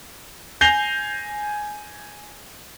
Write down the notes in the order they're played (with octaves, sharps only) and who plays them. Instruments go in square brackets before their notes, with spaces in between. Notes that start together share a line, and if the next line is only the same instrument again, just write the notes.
[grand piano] G#5 G6 A#6 C7 F7 G7